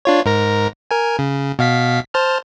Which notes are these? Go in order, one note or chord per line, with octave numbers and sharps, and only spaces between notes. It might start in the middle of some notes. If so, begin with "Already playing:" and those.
D4 F4 C#5
G#2 A#4 A#6
A#4 G#5
C#3
B2 F5 B6
C5 A5 F6